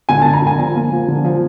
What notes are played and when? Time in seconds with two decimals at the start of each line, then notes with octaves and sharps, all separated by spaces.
0.09 D3 G#5
0.22 A5
0.26 D3
0.33 A#5
0.42 D3 G#5
0.59 F3
0.75 A#3
0.92 F3
1.08 D3
1.25 F3